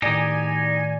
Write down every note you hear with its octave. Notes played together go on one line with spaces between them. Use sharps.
A2 D#3 D#4 G4 D5 G#5